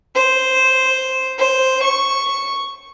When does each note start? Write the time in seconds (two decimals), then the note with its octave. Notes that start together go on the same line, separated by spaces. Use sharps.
0.16 C5
1.40 C5
1.85 C#6